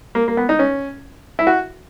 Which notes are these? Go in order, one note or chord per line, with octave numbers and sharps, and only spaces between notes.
A#3
A#3
B3
D#4
C#4
E4
F#4